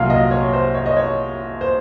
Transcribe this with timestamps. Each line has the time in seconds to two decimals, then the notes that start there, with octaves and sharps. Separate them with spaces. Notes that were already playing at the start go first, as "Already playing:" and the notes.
Already playing: C2 A#2 F#3 F5
0.10 D#5
0.31 C#5
0.53 C5
0.75 C#5
0.86 D#5
0.97 C#5
1.61 C5